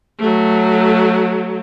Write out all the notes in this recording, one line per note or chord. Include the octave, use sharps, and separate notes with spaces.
F#3 A3